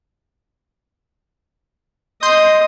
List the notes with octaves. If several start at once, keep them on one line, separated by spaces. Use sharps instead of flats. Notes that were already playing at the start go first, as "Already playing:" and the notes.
D#5 C6 D#6 G6